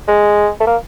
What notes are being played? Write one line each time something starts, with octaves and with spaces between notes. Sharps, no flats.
G#3
A3
A#3